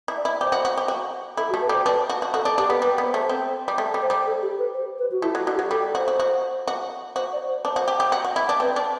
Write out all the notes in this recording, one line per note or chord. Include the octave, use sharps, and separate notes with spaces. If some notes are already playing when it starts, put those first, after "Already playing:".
E4
D5
E4
G4 C5
F#4
F#4
G4
F#4
E4 A4
F#4
A3
B4
G3 C5
D4 B4
F#4
F#4
F#4 A4
D4
D4 G4
B3
G3 B4
B3
C5
A3
C4
G3
A3
G3
C5
G3
A4
G4
B4
C5
B4
F#4
A3 E4
F#3 F#4
D3
G4
F#3
G3 A4
F#4 C5
F#4
F#4
F#4
F#4 C5
D5
C5
D4 C5
F#4
G4
G4
F#4
F#4
E4
D4
C4 B4
D4